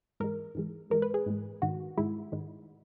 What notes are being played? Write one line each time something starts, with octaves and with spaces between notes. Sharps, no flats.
G#2 E3 G#3 A#4
G#2 E3 G#3
G#2 E3 G#3 A#4
B4
G#4
G#2 E3 G#3
G#2 D#3 G#3 F#4
G#2 D#3 G#3 E4
G#2 D#3 G#3